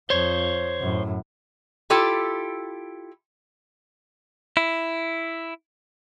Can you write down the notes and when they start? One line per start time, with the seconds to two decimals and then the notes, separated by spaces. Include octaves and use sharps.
0.10 F2 F3 C5 C#5
0.80 F#2 A2
1.90 E4 F4 G4 A4
4.57 E4